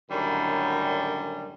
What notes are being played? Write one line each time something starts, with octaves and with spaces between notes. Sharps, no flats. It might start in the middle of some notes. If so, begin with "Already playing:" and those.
F#2 A2 D3 D#3 G3